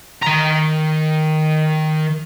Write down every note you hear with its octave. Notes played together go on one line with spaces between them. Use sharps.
D#3 A#5